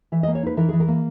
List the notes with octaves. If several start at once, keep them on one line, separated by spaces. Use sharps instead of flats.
E3 E5
A#3 D#5
C#5
D#4 B4
E3 A#4
E3 G#4
A#4
A#3